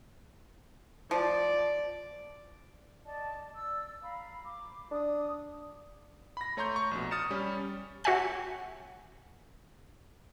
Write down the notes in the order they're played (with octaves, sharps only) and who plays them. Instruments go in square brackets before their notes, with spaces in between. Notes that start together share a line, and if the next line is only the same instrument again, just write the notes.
[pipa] F3 [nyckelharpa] D5
[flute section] D5 D#5 A5
D5 E6
F5 A#5 B5
D6
[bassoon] D4 [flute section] D#6
[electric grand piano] B5 A#6
A3 C#5 A#5 C6 C#6 G6
C#6
A#1 B2
D#6 F6 A6 C#7 E7
G3 C#4
[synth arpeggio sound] F#4 C#5 E5 G5 G#5 F#6